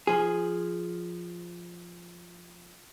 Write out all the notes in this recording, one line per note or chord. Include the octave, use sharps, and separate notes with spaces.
F3 G#4